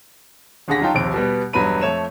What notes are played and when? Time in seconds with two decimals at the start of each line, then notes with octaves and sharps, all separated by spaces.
0.68 D#2 D3 G#4 F#5 A#6 B6
0.81 F#3 D#4 F4 G5 A5
0.95 A#1 D#2 C3 D7
1.14 B2 G3 B3
1.53 E1 G2 F#3 B3 B5 D#7
1.81 F2 A3 C#5 E7